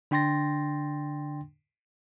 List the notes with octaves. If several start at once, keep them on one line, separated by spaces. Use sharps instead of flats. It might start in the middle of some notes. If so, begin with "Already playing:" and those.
D3 D4 G5 C6 A6 A#6